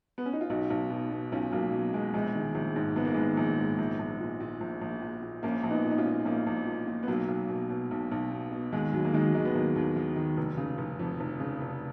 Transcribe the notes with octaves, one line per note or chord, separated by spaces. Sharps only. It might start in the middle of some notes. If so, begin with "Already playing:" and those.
B3
C#4
D#4
F4
B1 D#4 F#4
B1
B2
B2
B1 C#4 F4
B1 F#3 A#3
B2 F#3
B2 G#3
A#1 G#3
D#3
A#1
G#2
A#1 B3
A#3
D#3 G#3 B3
A#1
G#2
A#1
A#1
A#2
A#2
A#1
A#1
A#2
A#2
A#1 A#3 C#4
A#1
B3 D#4
A#2
D#4
C#4 F4
A#2
A#1 A#3 C#4
A#1
A#2
A#2
B3
B1 F#3 A#3
B1
B2
B2
B1
B1
B2
B2
D#2 G#3
D#2 F#3
A#3
D#3 G#3
F#3
D#3 G#3
B3
D#2 F#3 A#3
D#2
D#3
D#3
F1
C#3
F1
F2
F1
C#3
F1